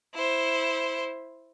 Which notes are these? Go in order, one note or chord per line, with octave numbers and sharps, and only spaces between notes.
E4 C5